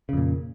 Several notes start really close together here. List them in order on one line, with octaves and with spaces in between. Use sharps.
C#3 F2 A#2